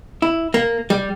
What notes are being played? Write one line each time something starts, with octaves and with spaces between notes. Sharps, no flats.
E4
A#3
G3